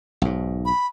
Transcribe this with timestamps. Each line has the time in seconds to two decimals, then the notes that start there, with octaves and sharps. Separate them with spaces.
0.22 B1 G#2
0.65 B5